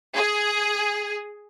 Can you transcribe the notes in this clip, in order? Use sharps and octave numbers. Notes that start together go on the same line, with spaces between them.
G#4